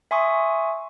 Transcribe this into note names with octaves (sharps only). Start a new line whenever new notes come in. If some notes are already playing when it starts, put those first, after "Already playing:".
E5 G#5 C6 C#6 D#6